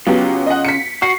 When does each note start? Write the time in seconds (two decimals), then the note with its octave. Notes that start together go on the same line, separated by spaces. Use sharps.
0.07 C#3 F#3 B3 F4 G4
0.47 D#5 F#5
0.65 B6 C#7
1.02 F#4 C7